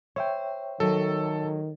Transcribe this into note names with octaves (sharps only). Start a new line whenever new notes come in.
C5 C#5 E5 G5
D#3 F#3 A4